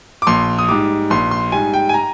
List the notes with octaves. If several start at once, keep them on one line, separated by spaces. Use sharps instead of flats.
D6
A#1 C6
D#6
G#2 G3 D6
A#1 C6
C6
G#2 G3 G#5
G5
G#5
A#5